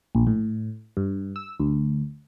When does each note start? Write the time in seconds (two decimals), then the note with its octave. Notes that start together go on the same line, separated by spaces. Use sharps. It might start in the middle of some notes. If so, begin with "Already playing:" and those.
0.15 A#1
0.27 A2
0.97 G2
1.36 E6
1.60 D2